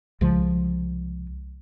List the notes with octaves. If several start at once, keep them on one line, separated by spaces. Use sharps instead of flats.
C2 C#3 F3 G#3